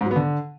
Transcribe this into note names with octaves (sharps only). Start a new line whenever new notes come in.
G#2
F#3
B3
D3